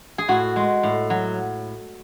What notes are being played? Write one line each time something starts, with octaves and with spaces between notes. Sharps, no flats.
G#4
A2 F#4
G#3
A2
F#3